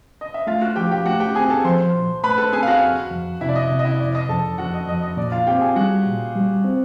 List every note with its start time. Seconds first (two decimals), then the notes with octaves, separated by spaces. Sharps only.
0.21 D#5
0.34 E5
0.47 A3 F4 F5
0.62 F#4 F#5
0.76 F3 G4 G5
0.91 G4 G5
1.05 A3 F#4 F#5
1.20 G4 G5
1.35 C4 G#4 G#5
1.50 A4 A5
1.64 F3 C5 C6
1.94 A#2
2.23 A3 B4 B5
2.38 A4 A5
2.52 C4 G#4 G#5
2.63 F5
2.67 F#4 F#5
2.82 F2
3.11 F2
3.41 C3 E4 E5
3.49 D5
3.56 D#5
3.70 C3
3.79 D#5
3.85 E4 E5
4.00 F2 D5
4.15 D#5
4.29 F2 A4 A5
4.58 F2 F#4 F#5
4.74 D#5
4.88 F2 D#5
5.03 D#5
5.17 A#2 D5
5.32 F4 F5
5.47 C4 G4 G5
5.61 G#4 G#5
5.76 G3 F#4 F#5
6.06 A#2
6.36 G3
6.64 C4